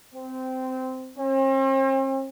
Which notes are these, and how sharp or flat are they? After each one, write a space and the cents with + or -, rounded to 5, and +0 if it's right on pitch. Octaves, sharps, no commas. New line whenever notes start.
C4 -15
C4 +45